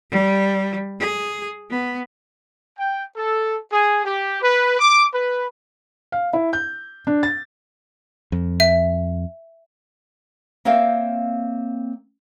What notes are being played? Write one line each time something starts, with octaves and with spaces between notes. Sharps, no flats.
G3
G#4
B3
G5
A4
G#4
G4
B4
D6
B4
F5
E4
G6
D4
A6
F2
E5
A#3 C4 C#5 E5 F5 G5